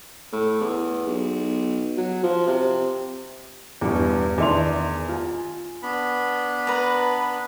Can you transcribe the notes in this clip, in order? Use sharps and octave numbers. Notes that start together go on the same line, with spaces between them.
A2
E2
B1
F#3
F3
C3
E2 G2 B2
E2 D#3 D4 E5 C6 F7
F4 G#5
B3 D4 B5
B4 A#5